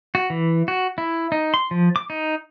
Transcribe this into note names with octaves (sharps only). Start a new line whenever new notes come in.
F#4
E3
F#4
E4
D#4
C6
F3
D6
D#4